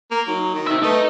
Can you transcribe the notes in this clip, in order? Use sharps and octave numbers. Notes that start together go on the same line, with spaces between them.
A#3
F#3 D#4
D#3
C4 E5
A3 D#4 B4